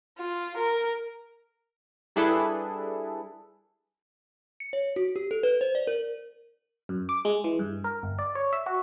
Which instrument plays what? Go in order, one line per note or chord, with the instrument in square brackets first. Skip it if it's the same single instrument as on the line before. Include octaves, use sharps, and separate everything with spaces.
[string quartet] F4
A#4
[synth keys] G3 D4 E4 G#4 A4 B4
[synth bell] C#7
C#5
F#4
G4
A4
B4
C5
D5
A#4
[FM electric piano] F#2
D6
G#3
E3
G2
A#4
G1
D5
C#5
E5
F#4